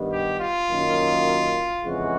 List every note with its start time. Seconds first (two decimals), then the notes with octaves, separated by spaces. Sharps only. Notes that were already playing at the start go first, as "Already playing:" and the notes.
Already playing: G2 D#3 G3 B3
0.12 G4
0.40 F4
0.69 F#2 D#3 F#3 A#3
1.84 F2 C#3 E3 G#3 F#4